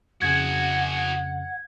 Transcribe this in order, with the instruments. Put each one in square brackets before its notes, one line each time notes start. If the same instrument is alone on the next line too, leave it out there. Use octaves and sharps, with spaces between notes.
[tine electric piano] F2 C#3 [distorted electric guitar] F#4 G#4 [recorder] F#5 [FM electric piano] G#6